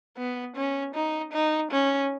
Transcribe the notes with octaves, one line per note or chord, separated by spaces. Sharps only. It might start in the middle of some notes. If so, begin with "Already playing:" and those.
B3
C#4
D#4
D#4
C#4